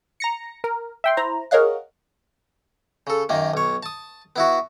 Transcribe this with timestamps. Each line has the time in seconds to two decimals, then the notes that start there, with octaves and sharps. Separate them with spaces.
0.20 A#5 A#6 C#7
0.64 A#4
1.04 E5 G5 C6
1.17 E4 C5 A#5
1.51 G#4 A#4 C#5 D#5 F5 F#5
3.07 C#3 A4
3.29 F#2 D#3 A#3
3.54 B1 C#5
3.83 A5 D#6
4.36 B3 E4 F#4